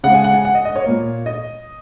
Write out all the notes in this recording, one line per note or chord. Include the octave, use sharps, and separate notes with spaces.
C#3 G#3 F#5
G#5
F#5
G#5
F#5
D#5
D#5
C#5
A#2 A#3
D#5